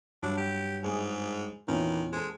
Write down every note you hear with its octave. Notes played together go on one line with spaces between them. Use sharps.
G2 F#3 D4
G4
G#2 G#3 G#4 G#5
E2 A#2 D#3 E3 C#4
G#3 A4 C5